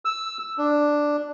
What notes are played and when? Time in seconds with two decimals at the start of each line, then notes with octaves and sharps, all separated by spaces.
0.05 E6
0.58 D4